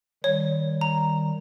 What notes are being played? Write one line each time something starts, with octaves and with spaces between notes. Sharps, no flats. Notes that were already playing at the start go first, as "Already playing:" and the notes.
D#3 G3 C#5
A#5